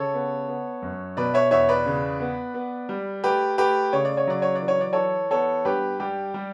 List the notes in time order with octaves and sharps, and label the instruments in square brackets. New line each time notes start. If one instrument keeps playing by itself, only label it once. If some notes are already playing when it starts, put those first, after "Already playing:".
Already playing: [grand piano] C#3 A4 C#5
B3
B3
F#2
B2 B4 D5
C#5 E5
E2 C#5 E5
B4 D5
C#3
B3
B3
G3
A3 G4 B4
A3 G4 B4
C#3 C#5
D5
C#5
F#3 D5
C#5
D5
E3
C#5
D5
E3 A4 C#5
B3 A4 C#5
G2 G4 B4
G3 G4
G3